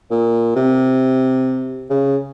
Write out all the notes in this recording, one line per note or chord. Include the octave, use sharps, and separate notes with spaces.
A#2
C3
C#3